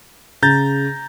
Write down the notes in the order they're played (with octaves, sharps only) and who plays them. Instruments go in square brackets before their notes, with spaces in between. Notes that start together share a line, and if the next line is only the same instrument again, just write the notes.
[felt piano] C#3 [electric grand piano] A#5 G6 A6